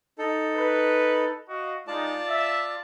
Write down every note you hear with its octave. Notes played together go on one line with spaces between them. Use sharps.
D#4 A4
B4
F#4 D#5 F5
G#3 D#4 F4 D5 A5
E5